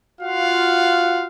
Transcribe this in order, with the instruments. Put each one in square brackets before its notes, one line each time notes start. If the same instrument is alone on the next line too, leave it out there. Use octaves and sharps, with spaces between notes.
[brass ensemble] F4 F#4 F5 F#5